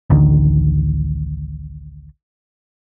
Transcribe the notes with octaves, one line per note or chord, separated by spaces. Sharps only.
A1 D2 D3 D#3